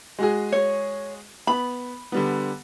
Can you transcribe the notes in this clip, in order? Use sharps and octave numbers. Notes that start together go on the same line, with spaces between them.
G#3 F#4 G#4
C#5
B3 B5
D3 G3 B3